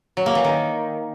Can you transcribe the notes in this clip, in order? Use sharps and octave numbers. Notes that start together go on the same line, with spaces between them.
F#3
A#3
E3
D#3